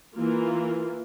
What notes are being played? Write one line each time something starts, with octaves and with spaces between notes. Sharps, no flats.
E3 A#3 F4